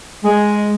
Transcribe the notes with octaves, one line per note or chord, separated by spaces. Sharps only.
G#3